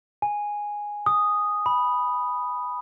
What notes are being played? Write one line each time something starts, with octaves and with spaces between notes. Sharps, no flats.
G#5
D#6
B5